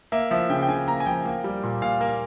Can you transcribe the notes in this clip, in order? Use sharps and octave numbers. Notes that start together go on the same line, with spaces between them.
A#3 E5
F3 E5
C#3 G5
G5
C#3 G#5
A#3 A#5
G#5
F3 G5
A#3
G3
A#2
A#2 F5
A#3